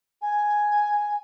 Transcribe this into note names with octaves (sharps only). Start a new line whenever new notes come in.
G#5